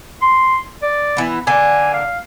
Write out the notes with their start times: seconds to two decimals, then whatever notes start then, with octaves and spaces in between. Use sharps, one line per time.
0.22 C6
0.82 D5
1.17 E3 B3
1.47 D3 A#3 G#5
1.94 F5